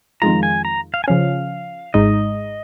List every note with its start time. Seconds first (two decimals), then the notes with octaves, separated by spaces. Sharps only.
0.22 F2 D#3 G#3 F4 A#5
0.43 G#5
0.65 A#5
0.94 F5
1.04 G#5
1.08 C#3 F3 C#4 F5
1.94 G#1 G#2 G#3 D#4 D#5